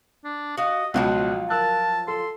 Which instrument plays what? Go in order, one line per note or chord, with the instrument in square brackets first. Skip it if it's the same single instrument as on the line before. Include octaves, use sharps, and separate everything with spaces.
[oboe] D4
[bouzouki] F#4 F5 [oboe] D#5
[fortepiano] C#2 B2 [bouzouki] F3 F#3 F4 [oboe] F#5
[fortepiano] A#4 E6 F#6 [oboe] A5
[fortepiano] A4 [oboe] C6